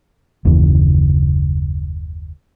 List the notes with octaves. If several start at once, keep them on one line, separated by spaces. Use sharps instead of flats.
F#1 D#2 C#3 E3